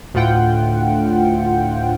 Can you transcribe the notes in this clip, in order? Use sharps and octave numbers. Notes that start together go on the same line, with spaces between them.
D2 A2 F4 F#5 G5